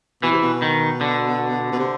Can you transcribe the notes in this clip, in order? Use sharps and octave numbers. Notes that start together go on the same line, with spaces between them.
B2 E3
C3
B2
D#3
D3
B2
C3